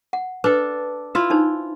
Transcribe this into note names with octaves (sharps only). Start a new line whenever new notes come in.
F#5
D4 A4 B4
E4 F4 E5
D4 D#4 C5